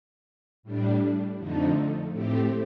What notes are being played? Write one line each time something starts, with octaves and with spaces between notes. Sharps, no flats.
A2 G3 D4
F2 D3 F3 A3 D#4
A2 A3 C4 G4